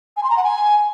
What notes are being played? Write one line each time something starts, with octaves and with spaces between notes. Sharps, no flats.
G#5
C6
A#5
F#5
G#5